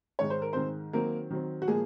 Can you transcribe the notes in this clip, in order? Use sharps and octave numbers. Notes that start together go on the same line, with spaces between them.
G#2 D#3 G#3 C#5
C5
A#4
G#2 D#3 G#3 C4 C5
D#3 F#3 A#3 C4 A#4
D#3 F#3 C4
F#4
A#2 F3 G#3 A#3 G#4